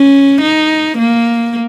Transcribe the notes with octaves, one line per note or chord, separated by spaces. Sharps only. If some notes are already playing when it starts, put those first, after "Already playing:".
Already playing: C#4
D#4
A#3